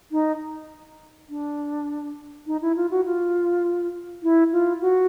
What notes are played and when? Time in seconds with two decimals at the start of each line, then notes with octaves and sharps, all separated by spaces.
0.12 D#4
1.29 D4
2.47 D#4
2.62 E4
2.76 F4
2.91 F#4
3.05 F4
4.23 E4
4.52 F4
4.82 F#4